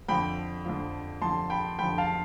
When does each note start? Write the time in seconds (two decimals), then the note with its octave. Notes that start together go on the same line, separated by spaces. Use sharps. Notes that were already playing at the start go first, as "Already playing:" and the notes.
0.08 F2 D3 F3 G5 B5
0.65 F2 D3 F3
1.22 F2 D3 F3 A5 C6
1.50 G5 B5
1.78 F2 D3 F3 G5 B5
1.98 F5 A5